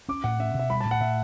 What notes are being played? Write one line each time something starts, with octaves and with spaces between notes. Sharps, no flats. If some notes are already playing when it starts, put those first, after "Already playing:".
C#4 D6
A2 F#5
C#4 E5
B2
E5
G3 B5
A5
A2
F#5
A2 E5